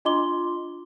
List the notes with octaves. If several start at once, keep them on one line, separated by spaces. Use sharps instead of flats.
D4 F4 D#5 C6 D6 G7